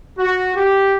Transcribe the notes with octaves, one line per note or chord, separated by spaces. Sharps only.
F#4
G4